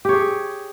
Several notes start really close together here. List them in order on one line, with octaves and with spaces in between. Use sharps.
G4 C#5 G#4